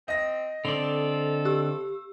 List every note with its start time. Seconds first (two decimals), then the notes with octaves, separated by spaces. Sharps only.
0.08 C4 D#5 A#6
0.65 D3 C4 A4 D5 F7
1.45 G4 E6